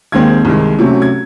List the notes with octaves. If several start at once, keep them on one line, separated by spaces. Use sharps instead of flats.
D#2 D#3 G#3 C4 G#6
C2 C3 D#3 G#3
C3 F#3 A3 C#4
G#6